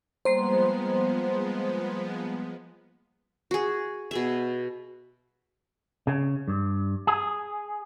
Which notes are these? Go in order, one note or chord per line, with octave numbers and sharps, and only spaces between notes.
F3 G3 G#3 A#3 B3 C5 A#5 C6
F#4 G#4
B2 G#4 E5
C#3
G2
G#4